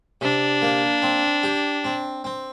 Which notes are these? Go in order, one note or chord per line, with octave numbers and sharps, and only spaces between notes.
C3 D4
A#3
C4
G4
C4
C4